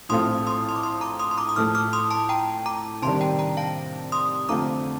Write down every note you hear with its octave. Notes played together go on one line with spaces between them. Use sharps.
A#1 A2 A3 C4 F4 C6 D#6
C6 D#6
C6
D6
C6 D#6
A#5 D6
C6 D#6
C6
A#5 D6
D#6
A2 F3 A3 D6 F6
D6 F6
C6 D#6
A5 C6
G5 A#5
A#5 D6
C3 D#3 G3 D4 A5 C6
G5 A#5
G5 A#5
F5 A5
C6 D#6
F2 D3 A3 C4 F4 A#5 D6